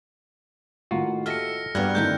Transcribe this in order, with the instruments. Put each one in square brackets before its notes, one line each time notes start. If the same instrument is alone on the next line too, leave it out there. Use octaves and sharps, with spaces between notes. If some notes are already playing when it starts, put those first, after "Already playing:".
[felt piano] A2 D#3 A#3 [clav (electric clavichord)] F4 F#4
[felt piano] G4 [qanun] A4 D#5 E5 [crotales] F6 A#6 C#7
[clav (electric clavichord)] G2 B3 [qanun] G3 A#3 F#4 [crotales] F6 F#6 G#6
[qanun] D3 D#3 E4 [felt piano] A3 A#3 C4 [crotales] G6